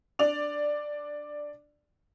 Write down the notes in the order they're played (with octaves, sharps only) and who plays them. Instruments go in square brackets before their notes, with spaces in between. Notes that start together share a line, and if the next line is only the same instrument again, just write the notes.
[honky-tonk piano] D4 D5 F7